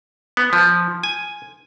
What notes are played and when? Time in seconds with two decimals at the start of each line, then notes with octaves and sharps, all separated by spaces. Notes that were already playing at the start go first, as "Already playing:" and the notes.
0.37 B3
0.53 F3
1.03 G#5